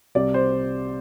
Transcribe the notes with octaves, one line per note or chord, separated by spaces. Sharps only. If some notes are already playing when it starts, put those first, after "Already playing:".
C2 C3 G3 D5
C5